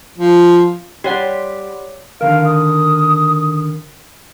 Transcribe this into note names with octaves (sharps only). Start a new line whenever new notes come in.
F3
G3 G4 C#5 F#5
D3 D#3 A#4 F5
D#6